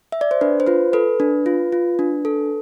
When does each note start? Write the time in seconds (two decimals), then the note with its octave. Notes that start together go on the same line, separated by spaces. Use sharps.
0.12 E5
0.21 D5
0.31 C5
0.41 D4 B4
0.60 C5
0.67 F4 B4
0.93 A4 B4
1.20 D4
1.46 F4
1.72 F4
1.99 D4
2.25 A4